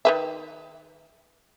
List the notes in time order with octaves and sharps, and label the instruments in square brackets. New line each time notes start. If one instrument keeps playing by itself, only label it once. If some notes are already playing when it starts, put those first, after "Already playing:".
[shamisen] D#3 B4 E5